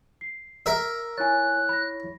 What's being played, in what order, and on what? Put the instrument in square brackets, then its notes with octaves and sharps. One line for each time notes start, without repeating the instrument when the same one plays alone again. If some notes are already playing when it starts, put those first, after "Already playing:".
[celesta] C7
[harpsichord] A#4 E5
[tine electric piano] E4 C#5 [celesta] G#5 A6 [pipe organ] F#6
[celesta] B5 A#6